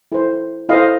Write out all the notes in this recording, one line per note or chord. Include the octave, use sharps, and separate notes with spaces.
E4 A4 C5
E4 A4 C5 D#5 F5